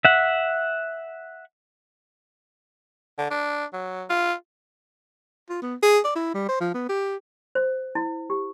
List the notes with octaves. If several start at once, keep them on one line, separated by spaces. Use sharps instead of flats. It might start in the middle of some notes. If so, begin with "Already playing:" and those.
E5 F#5
D3
D4
F#3
F4
F4
B3
G#4
D5
E4
G3
C5
F3
B3
G4
C5
E4
G4